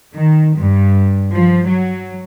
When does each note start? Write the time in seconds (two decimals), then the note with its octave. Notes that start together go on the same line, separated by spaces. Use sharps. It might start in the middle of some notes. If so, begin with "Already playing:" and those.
0.14 D#3
0.58 G2
1.31 F3
1.67 F#3